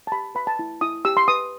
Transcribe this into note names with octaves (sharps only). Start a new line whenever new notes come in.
A5
G4 B5
B4 B5
A5
E4
E4 D#6
G4 E6
C6
B4 D#6